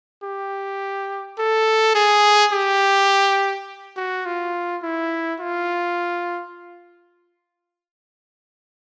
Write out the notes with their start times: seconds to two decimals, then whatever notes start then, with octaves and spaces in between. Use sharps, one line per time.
0.23 G4
1.39 A4
1.95 G#4
2.53 G4
3.97 F#4
4.25 F4
4.83 E4
5.40 F4